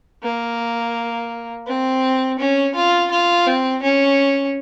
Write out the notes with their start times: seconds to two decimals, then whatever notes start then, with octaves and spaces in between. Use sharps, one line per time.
0.23 A#3
1.67 C4
2.39 C#4
2.75 F4
3.11 F4
3.46 C4
3.82 C#4